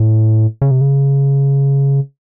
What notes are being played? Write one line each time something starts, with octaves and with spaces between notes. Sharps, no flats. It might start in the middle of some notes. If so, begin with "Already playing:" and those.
Already playing: A2
C#3
C3
C#3